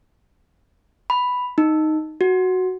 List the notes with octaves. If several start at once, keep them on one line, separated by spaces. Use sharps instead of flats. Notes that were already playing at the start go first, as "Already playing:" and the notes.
B5
D#4
F#4